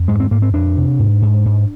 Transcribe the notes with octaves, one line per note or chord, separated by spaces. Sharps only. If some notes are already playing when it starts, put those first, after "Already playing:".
Already playing: F2
G#2 G#3
C4
G#2 A#3
C4
F2 D4
C3
G#2
G#2
G#2